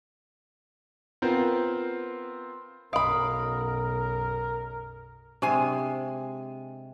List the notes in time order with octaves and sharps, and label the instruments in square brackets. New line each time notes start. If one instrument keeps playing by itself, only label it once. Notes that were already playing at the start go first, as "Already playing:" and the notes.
[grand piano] B3 C4 F4 A#4 C5
[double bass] B1 F#2 [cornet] A#4 [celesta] D#5 D#6 D7 [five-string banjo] F5 B5
[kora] C3 G#3 [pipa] D4 C5 G#5